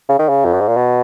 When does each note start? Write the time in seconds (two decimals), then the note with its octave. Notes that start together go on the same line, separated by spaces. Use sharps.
0.09 C#3
0.19 D#3
0.29 C#3
0.45 F2
0.53 F#2
0.61 G#2
0.68 A#2
0.76 B2